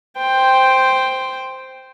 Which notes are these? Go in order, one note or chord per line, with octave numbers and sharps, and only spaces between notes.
C5 G5